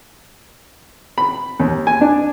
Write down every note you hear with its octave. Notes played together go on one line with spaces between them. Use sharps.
B5
D#2
G#5
D4